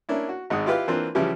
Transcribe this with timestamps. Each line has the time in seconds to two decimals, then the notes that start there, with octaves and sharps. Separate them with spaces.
0.09 A#3 C#4 D4 E4
0.29 F#4
0.50 G#1 G#2 F#5 D#6
0.66 E4 F4 G4 B4 F5
0.88 E3 A#3 C4 D4 F4 B4
1.15 C#3 E3 F3 G3 E4 G4